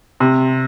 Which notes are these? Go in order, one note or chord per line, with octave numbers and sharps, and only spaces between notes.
C3